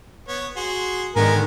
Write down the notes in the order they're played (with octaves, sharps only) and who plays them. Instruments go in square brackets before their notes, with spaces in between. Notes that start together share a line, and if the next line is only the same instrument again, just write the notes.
[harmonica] B3 C#5
F#4 G#4 C6
[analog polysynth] G#2 D3 D#3 [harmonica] B3 G#5 [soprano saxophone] A#4